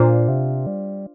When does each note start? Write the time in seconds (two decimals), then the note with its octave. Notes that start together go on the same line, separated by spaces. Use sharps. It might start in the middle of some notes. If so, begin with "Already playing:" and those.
Already playing: A#2 D4 F4 C5
0.28 C3
0.67 G3